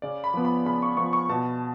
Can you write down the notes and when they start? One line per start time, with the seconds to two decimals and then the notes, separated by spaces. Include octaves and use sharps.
0.02 C#3 D5
0.24 B5
0.34 F3 B3
0.45 B5
0.65 C#3 B5
0.82 C#6
0.97 F3 B3 C#6
1.13 C#6
1.29 B2 A5